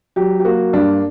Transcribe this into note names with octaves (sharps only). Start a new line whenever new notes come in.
F#3 G4
G4
A#3 F#4
G2 D4